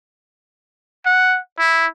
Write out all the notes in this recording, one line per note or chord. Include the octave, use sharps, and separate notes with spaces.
F#5
E4